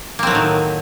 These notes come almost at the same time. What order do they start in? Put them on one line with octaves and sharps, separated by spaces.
A#3 C4 F#3 A2 D#3